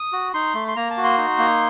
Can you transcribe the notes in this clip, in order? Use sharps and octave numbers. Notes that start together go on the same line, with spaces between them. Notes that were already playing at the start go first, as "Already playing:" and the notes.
Already playing: D#6
F#4
D#4 C6
A3
C6
A#3 A#5
A5
F#4
C6
D#4
A#3